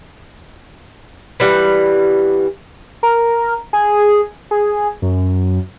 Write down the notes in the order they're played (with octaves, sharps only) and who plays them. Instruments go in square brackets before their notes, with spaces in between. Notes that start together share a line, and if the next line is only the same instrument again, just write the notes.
[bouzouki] E3 G3 F#5
[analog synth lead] A#4
G#4
G#4
F#2